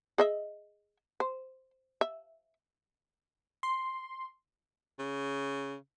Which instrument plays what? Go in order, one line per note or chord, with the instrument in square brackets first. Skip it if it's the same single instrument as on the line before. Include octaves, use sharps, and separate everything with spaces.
[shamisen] G#4 D#5 E5
C5
E5
[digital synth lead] C6
[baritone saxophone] C#3